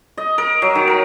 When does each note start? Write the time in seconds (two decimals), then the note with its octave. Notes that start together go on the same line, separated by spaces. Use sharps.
0.17 D#5
0.38 A#4
0.62 F#3
0.75 D#3
0.87 A#4